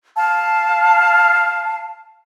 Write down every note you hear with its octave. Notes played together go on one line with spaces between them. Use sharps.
F5 A5